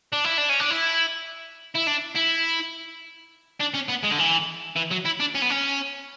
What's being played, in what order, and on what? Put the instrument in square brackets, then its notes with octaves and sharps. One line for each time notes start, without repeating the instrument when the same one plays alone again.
[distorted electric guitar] D4
E4
D4
C#4
D4
E4
E4
D4
E4
D4
C#4
B3
G#3
D3
E3
E3
F#3
E4
D4
C#4
B3
C#4